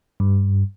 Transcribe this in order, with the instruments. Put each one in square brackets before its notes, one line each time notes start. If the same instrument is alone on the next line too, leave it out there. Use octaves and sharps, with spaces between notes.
[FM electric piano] G2